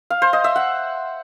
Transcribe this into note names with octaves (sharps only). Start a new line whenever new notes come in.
F5
C5
D#5
E5
F#5